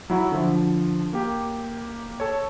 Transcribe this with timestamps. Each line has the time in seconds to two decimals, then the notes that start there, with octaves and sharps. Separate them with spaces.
0.10 F#3 E4 F#4
0.32 D3 F3
1.13 A#3 G4
2.20 A4 C#5